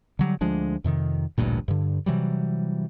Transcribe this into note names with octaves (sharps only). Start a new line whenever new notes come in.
D3 F#3 G3
D2 F3 G#3 D4
F2 C3 D#3
A1 D2 G2 A#2
G2 D3
C3 E3 F#3 G3